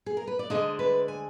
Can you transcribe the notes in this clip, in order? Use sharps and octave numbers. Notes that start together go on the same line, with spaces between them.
G#4
A#4
B4
D5
D2 D3 G#3 D4 D#5
B4
G#5